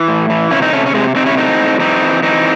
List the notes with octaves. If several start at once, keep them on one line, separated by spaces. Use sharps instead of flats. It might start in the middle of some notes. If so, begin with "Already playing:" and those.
Already playing: E3
A2
E3
C3 C#4 E4
C4 D#4
C3 A3 C#4
C#4
C3 G#3 C4
C3 C4 D#4
C#4 E4
A2 C4 D#4
A2
E3 C4 D#4
E3
E3 C4 D#4